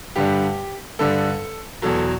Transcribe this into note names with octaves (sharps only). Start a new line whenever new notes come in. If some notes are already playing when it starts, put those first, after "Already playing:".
G2 D3 G3 G4
G2 D3 G3 A4
E2 B2 F#3 A4